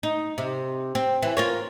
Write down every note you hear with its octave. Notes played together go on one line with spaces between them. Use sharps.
D#4
C3
C4
E3
F4 A#4 C#5